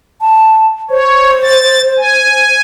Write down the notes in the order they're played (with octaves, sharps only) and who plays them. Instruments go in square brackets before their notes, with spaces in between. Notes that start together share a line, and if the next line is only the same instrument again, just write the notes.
[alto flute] A5
[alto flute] C5 [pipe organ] C#5
[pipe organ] A6
G#5